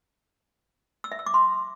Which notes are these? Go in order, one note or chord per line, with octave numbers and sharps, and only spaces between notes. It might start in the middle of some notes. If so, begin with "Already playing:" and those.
E6
E5
E6
D6
C6